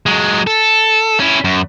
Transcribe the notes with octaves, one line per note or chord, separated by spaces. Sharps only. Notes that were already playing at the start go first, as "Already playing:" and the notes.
F#3 G#3
A4
C#4 E4
F#2